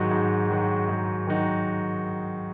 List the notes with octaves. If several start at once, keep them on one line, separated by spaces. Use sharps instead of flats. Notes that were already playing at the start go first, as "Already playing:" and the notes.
Already playing: G#2 D#3 F#3 D#4 F#4
G#2
D#3 F#3 D#4 F#4
G#2
D#3 F#3 D#4 F#4